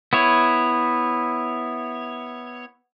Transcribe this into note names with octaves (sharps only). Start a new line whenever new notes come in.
B3 E4 C#5